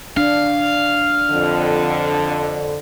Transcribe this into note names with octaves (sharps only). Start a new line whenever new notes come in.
D4 F5
F2 D3